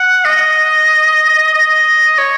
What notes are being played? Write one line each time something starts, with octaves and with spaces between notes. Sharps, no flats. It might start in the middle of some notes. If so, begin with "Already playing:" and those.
Already playing: F#5
D#5
D#5
C#5